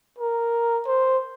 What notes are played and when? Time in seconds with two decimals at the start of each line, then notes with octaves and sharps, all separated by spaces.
0.19 A#4
0.87 C5